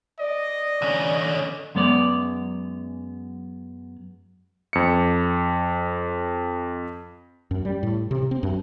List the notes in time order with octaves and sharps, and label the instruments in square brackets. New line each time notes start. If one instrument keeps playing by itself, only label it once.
[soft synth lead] D5 [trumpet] D#5
[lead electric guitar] D3 C#4
[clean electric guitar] F#2 G#3 B3 C#5 D5
[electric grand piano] F2 C#7
[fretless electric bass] F#2
G3
A2
C3
C4
F#2